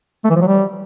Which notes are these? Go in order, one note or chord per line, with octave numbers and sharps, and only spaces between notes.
A3
E3
F3
F#3
G3